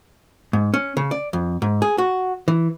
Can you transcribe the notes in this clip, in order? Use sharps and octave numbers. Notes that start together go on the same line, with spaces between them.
G#2
C#4
C#3
D5
F2
G#2
G#4
F#4
E3